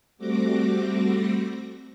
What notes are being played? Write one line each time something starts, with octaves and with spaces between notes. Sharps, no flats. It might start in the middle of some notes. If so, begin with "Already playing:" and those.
G3 A3 C4 F#4 D6 A#6